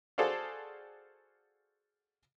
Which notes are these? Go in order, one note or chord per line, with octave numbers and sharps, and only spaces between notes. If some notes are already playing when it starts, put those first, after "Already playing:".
F#4 G#4 A4 C5 D5 F5